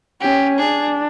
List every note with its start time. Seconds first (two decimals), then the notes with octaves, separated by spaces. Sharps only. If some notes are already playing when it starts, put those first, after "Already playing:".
0.21 C#4 G4
0.58 D4 G#4